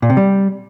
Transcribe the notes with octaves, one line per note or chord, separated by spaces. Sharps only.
A#2
C3
G3